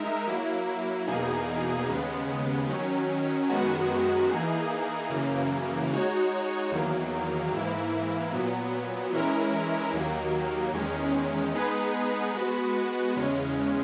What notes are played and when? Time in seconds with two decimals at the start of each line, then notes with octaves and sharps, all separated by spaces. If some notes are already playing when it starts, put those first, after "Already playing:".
Already playing: G#3 D#4 A#4 E5
0.27 F#3 A#3 E4
1.07 E2 B2 A#3 D#4 G#4
1.88 D#2 C#3 G#3 B3
2.69 D#3 F#3 C#4
3.49 F#2 D#3 G#3 B3 F#4
4.29 E3 A#3 D#4 G#4
5.09 F#2 C#3 E3 A#3
5.90 G#3 D#4 F#4 C#5
6.71 E2 D#3 F#3 A#3
7.52 G#2 E3 A#3 E4
8.32 A#2 F#3 B3
9.12 E3 G#3 C#4 E4 A#4
9.93 D#2 D#3 F#3 A#3
10.74 E2 D#3 G#3 C#4
11.54 G#3 B3 D#4 G#4 B4
12.35 G#3 B3 F#4 B4
13.16 E2 C#3 G#3 C#4